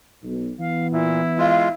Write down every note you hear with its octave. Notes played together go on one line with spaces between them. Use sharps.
B1
E3 B3 F5
A#2 E4
G#3 F4 F5